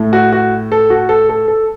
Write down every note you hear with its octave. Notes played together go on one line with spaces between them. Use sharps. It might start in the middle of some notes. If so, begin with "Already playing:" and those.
Already playing: A2 A3
F#4
F#4
A4
F#4
A4
A4
A4